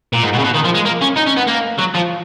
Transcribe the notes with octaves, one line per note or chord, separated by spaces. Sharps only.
A#2
G#2
B2
C#3
B2
D#3
F3
G#3
A#3
C#4
D#4
C#4
B3
A#3
F#3
F3